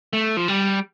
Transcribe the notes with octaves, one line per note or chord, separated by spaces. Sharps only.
A3
F3
G3